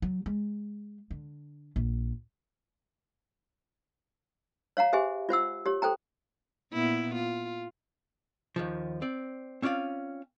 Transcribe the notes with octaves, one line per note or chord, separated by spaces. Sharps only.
F#3
G#3
D3
A#1
C#5 F5 F#5 A#5
G4 G#4 C5 E5 G#5
F4 C5 F#5 E6
G4 C#5
A4 C5 G5 A#5
A#2 B3 E4
F4
D#2 D#3 F3
C4 D5
C4 C#4 F4 D5 F5